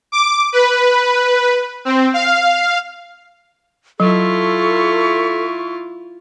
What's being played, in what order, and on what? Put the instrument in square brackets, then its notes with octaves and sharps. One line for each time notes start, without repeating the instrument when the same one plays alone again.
[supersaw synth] D6
B4
C4
F5
[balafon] F#3 [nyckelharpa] E4 F4 [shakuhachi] A4 [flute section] C#6